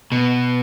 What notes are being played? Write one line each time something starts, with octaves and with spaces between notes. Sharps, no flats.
B2